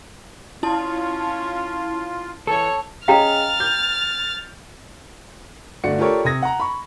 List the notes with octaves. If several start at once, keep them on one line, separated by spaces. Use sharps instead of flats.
C#4 E4 F4 A5
E3 A4 C#5
C#4 G#4 D#5 F5 G5 A#5 F6 A6
G6
G1 A3 F#4 D5 C#7
F4 G4 A4 A#4 C#5 D5
C3 D#6 G#6 A#6
F#5 A#5
B5 C#6